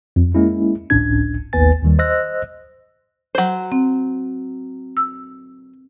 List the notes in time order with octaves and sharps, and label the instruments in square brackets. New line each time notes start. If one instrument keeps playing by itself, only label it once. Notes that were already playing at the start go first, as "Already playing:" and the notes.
[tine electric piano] F2
G#3 A#3 C#4 E4
G1 C#2 A2 C#4 D4 G#6
A1 D#2 B3 B4 G#5 A6
D#2 D#3 G3
C5 D#5 E6 F#6 A#6
[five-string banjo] F#3 C5
[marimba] C4
E6